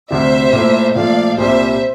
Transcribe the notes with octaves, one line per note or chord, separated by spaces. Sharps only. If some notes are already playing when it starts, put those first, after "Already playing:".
D2 C3 G3 C5 E5
A#2 A3 E4
A#2 F3 A3 D5 F5
C2 A#2 G3 C5 E5